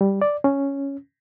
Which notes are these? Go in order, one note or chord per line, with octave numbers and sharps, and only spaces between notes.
G3
D5
C#4